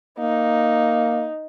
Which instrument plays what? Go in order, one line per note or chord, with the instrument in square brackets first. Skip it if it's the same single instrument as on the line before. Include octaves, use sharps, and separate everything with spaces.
[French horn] A#3 [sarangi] D#4